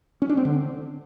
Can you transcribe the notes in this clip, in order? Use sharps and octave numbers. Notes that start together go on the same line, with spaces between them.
C#4
D4
C4
D3